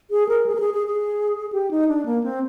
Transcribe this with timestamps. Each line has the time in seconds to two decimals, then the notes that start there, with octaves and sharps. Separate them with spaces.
0.11 G#4
0.29 A#4
0.46 G#4
0.55 A#4
0.60 G#4
0.74 G#4
0.87 G#4
1.53 G4
1.71 D#4
1.88 D4
2.06 A#3
2.24 C4